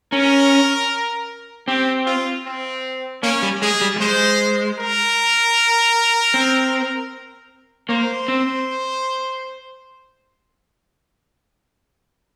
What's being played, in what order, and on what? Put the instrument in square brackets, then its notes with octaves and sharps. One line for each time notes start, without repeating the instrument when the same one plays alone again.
[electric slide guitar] C#4 [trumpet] A#4
[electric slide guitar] C4 [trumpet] G4
[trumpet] F4
C4
[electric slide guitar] A#3 [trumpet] C#4
[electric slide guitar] G3
[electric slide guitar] G#3 [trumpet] G#4
[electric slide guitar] G3
G3
[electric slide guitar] G#3 [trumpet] C5
[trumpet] A#4
[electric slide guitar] C4
[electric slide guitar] A#3 [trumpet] C5
[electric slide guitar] C4